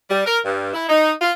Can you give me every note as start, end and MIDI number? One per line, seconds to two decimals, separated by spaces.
0.10 0.24 55
0.26 0.40 70
0.45 0.71 43
0.73 0.85 64
0.89 1.12 63
1.21 1.31 65